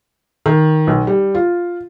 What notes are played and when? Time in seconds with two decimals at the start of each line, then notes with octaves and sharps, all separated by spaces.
0.46 D#3
0.87 B1
1.07 G3
1.35 F4